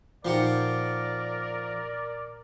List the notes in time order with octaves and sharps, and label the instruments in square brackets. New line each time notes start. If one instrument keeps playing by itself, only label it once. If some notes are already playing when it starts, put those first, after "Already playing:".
[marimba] A#2 D#4 [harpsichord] F3 G4 F#5 [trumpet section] A#4 [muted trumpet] D5